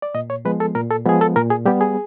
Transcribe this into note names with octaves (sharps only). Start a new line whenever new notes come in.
D5
A#2 D#5
C#5
F3 G#3 B3 B4
A4
A#2 A#4
A4
F3 G#3 B3 G#4
A4
A#2 A#4
G#4
G3 B3 G4
G#4